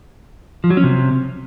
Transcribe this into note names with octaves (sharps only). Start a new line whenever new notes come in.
F3
F#3
C#4
C3